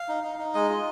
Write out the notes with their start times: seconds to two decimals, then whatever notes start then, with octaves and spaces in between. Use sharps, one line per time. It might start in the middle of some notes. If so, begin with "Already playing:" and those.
Already playing: F5
0.09 D#4
0.23 D#4
0.39 D#4
0.54 G#3 D#5
0.69 F4